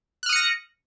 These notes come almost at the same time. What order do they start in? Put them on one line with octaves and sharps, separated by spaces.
F#6 F6 D#6 C#7 A#6